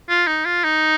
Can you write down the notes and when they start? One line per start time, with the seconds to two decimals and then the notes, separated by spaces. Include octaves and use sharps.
0.10 F4
0.27 D#4
0.45 F4
0.64 D#4